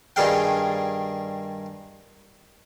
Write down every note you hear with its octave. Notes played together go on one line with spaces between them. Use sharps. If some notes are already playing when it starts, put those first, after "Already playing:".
G2 D#3 G3 G#4 F5 G5